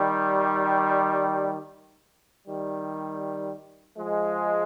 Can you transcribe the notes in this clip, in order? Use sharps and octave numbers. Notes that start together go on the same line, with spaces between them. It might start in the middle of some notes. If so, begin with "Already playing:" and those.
Already playing: D#3 G3
D#3 G3
F3 G#3